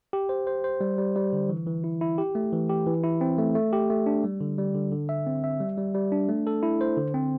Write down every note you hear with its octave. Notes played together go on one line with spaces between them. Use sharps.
G4
C5
C5
C5
G3
G3
G3
D3
E3
E3
E4
E4
G4
A3
E3
G4
E3
E4
C4
A3
A3
G4
A3
D4
G3
D3
G3
D3
D3
E5
C4
E5
G3
G3
G3
D4
A3
A4
E4
C5
D3
C4